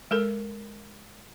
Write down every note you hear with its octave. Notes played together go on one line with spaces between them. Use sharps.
G#3 A4 A#4